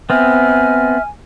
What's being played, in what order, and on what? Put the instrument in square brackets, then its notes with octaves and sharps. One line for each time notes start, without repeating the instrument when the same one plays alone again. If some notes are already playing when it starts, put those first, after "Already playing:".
[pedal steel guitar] B3 C4 [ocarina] E5 [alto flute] G#5 [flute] F6